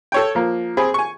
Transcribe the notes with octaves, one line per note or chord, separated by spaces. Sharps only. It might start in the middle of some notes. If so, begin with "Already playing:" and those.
A4 C#5 G5
F3 A#3
C4 G#4 B5
G#5 C#6